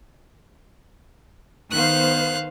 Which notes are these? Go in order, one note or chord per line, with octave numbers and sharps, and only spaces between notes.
D#3 B3 C5 F5 F#6